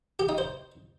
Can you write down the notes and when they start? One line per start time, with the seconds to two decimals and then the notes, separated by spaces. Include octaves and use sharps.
0.19 G4
0.29 D#4
0.38 C5